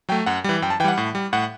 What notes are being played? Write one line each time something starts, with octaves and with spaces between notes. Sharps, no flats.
F#3 A3 G5
F#2 F#5
E3 G3
F#2 G5
A5
E3 G3 F#5 G5
A2
G3
A2 F#5